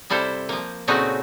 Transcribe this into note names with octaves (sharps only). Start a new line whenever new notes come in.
C3 G3 E4 A4 C5
F3 A#3
A#2 C#3 A3 C4 D#4 F#4